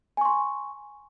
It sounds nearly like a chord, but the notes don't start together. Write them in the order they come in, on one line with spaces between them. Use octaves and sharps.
G#5 C#6 C6